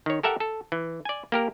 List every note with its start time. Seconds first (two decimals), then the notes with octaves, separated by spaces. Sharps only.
0.06 D#3 C#5
0.23 G4 A4 A#4 E5 F#5
0.40 A4
0.72 E3
1.05 D5 G#5
1.32 A#3 G4 A#4